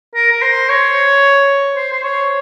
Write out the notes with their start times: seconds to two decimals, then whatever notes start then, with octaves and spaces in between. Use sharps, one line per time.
0.15 A#4
0.32 A#4
0.42 C5
0.69 C#5
1.76 C5
1.92 C5
2.03 C#5